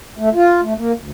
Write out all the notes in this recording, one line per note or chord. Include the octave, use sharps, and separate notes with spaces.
A3
F4
A3
A#3
D2